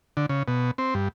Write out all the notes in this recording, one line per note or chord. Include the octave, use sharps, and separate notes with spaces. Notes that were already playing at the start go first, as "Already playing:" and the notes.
D3
C#3
B2
C4
G2